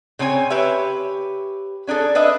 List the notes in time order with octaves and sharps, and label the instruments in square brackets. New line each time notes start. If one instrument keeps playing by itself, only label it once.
[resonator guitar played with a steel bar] C#3 C4 C#5 G#5
G4 B4 C#5 E5
C#4 D4 G#4 A4
D4 B4 D#5 E5